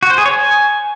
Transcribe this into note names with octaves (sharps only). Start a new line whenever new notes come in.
F#4
C5
G#4
C#5
G#5